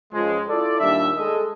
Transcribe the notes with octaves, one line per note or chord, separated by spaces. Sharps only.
C#2 F3 G#3
E4 F4 A4 D5
D#2 A#2 G3 D4 E5
G#3 A4 D#5